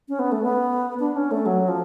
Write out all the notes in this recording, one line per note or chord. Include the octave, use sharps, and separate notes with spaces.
C#4
B3
A3
B3
D4
C#4
A3
F#3
F3